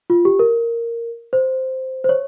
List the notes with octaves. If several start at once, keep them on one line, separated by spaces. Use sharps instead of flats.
F4
G4
A#4
C5
C5
C#5